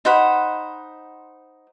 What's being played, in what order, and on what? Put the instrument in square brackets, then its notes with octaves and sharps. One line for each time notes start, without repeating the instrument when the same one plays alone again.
[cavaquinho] D#4 C5 F#5 B5